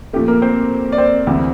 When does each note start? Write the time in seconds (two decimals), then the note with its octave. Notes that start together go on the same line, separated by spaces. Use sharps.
0.13 A#2 F3 A3 G4
0.28 A#3 A#4
0.42 C4 C5
0.92 D5
0.98 C4 C5
1.27 D2 C3 E3